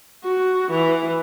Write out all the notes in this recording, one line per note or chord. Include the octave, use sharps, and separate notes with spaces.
F#4
E3